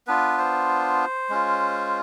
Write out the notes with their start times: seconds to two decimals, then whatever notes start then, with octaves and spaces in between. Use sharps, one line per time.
0.07 B3 D4 F4 B4
0.38 C5
1.30 G#3 C#4 F4